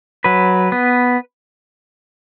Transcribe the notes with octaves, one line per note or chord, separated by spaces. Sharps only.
F#3 B4
B3